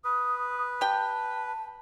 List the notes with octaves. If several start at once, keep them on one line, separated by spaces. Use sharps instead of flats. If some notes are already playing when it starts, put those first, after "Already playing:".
B4 D#6
G4 G5 A5